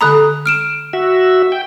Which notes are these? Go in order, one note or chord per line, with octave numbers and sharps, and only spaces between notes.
D3 A4 A#5 B5 D#6 F#6
F6 D7 E7
F#4 E5
G5